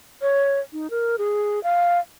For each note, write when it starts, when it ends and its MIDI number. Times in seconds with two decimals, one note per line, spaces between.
0.22 0.60 73
0.73 0.90 63
0.90 1.16 70
1.18 1.62 68
1.63 2.00 77